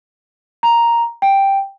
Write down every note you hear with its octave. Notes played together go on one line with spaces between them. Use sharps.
A#5
G5